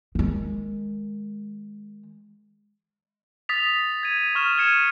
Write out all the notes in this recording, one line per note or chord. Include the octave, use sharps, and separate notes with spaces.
D#3 G#3
D#6 A6 B6 F7
G#6 D#7
C#6 F6 E7
F6 G#6 C#7 D#7 E7